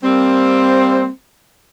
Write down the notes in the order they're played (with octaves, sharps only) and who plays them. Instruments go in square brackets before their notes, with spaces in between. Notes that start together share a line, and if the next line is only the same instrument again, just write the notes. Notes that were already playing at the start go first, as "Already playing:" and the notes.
[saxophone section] G3 A#3 C4